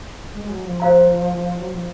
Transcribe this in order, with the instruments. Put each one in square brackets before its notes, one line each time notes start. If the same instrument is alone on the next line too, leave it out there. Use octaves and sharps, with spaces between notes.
[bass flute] G#3
F#3
F3
[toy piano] C5 F5 A#5
[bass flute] F#3
F3